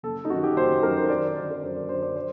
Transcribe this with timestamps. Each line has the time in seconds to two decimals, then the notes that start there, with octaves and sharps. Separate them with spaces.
0.03 F#1 A4
0.25 D#4
0.30 F#2 D#3 F#4
0.44 G4
0.57 F#1 C5
0.83 F#2 D#3 A#4
0.97 C5
1.09 F#2 D5
1.36 D3 F#3 D5
1.51 A#4
1.63 F#2 C5
1.76 D5
1.89 D3 F#3 C5
2.02 D5
2.16 C5